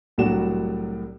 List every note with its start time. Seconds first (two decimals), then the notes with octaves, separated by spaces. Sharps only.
0.18 C2 A2 F#3 D4 F#4 E7